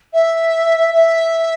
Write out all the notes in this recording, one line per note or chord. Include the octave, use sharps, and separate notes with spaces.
E5
E5